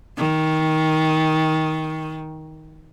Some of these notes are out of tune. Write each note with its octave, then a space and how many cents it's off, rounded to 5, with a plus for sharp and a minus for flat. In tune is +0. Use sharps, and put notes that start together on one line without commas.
D#3 +15